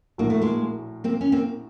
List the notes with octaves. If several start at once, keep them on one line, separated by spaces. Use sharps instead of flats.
A#1 A2 F#3 A#3
A3
G#3 A#3
A#3 C4
C#4
A#3 C4